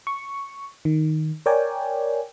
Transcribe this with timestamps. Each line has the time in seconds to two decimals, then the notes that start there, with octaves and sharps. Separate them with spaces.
0.07 C#6
0.85 D#3
1.46 A#4 C#5 D5 G5 G#5